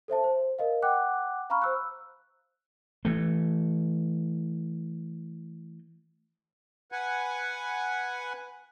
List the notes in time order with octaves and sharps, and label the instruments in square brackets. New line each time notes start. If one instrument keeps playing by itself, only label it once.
[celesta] A4 C5 E5 A5
C5
A#4 D#5 F5
F#5 G5 D6 F#6
F5 A#5 B5 C#6 F6
C5 E6 F#6
[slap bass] E3 A3
[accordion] B4 F#5 G#5